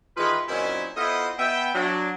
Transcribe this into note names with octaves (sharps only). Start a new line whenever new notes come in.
D#3 E3 G#3 F4 B4
F#2 A#2 D#3 C4 C#4 E4
B3 E4 F4 A4 C5 D#5
B3 E5 G5
F#3 D4